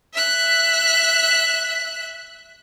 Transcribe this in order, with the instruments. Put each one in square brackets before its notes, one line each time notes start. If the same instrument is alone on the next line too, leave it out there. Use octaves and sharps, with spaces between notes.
[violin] E5 F#6